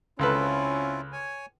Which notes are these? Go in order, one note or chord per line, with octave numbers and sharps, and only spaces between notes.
C#2 C4 C#4 E4 F4 A4 B4
C#5 G#5